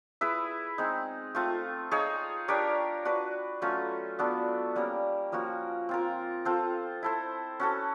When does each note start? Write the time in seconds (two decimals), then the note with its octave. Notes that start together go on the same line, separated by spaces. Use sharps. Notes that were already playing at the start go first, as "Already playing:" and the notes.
0.21 E4 G#4 B4 E5
0.78 G#3 C4 D#4
1.35 A3 C4 F4
1.91 D#4 G#4 C#5 F5
2.48 D4 G4 A#4 C#5
3.05 D4 F#4 B4
3.62 F#3 A3 C#4 F4
4.19 B3 D4 F#4 A4
4.76 G3 A#3 C#4
5.32 F3 A#3 C#4 F#4
5.89 C4 F4 A#4
6.45 C4 F4 A4 C5
7.03 E4 A4 C5
7.60 C#4 F#4 A4